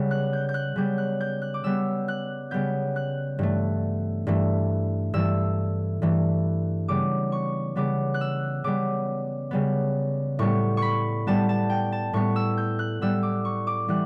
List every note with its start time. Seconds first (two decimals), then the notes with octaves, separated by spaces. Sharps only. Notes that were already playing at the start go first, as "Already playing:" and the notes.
Already playing: C#3 G3 B3
0.11 F#6
0.33 G6
0.49 G6
0.54 F#6
0.76 C#3 G3 B3 G6
0.98 F#6
1.21 G6
1.42 F#6
1.54 D6
1.64 C#3 G3 B3 E6
2.08 F#6
2.51 C#3 G3 B3 G6
2.96 F#6
3.39 G2 E3 A3
4.27 G2 E3 A3
5.14 G2 E3 A3 E6
6.02 G2 E3 A3
6.88 C#3 G3 B3 D6
7.32 C#6
7.76 C#3 G3 B3 D6
8.14 F#6
8.21 E6
8.64 C#3 G3 B3 D6
9.51 C#3 G3 B3
10.39 A2 G3 B3 C#6
10.77 C#6
10.82 B5
11.27 A2 G3 B3 A5
11.49 A5
11.70 G5
11.92 A5
12.13 A2 G3 B3 C#6
12.36 E6
12.58 G6
12.79 F#6
13.01 A2 G3 B3 E6
13.23 D6
13.45 C#6
13.67 D6
13.88 E3 G3 B3 F#6